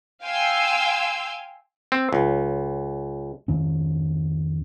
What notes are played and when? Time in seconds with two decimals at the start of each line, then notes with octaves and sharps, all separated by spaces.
0.24 F5 G5 G#5 C6 E6
1.92 C4
2.13 C#2
3.48 F2 D#3 C#4